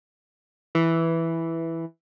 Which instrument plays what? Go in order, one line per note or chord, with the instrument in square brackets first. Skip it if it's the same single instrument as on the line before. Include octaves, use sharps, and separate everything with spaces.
[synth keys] E3